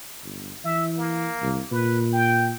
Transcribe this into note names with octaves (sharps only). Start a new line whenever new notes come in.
G1
E3 E5
A#3
C2
A#2 B4
G5